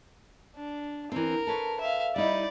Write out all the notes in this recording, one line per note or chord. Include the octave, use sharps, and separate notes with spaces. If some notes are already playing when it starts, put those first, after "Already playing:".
D4
E3 C4 A#4
A4 B4 C#5
E5 F5
G3 D#4 E4 D5 B5